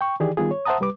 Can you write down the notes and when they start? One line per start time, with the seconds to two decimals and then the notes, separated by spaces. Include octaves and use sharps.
0.01 G5 C#6
0.20 D#3 E3 G4 G#4 D5
0.37 D#3 G3 B3 F4 G#4
0.51 C#5
0.66 C5 E5 F#5 A5 A#5 D#6
0.80 C2 G3 B4 D6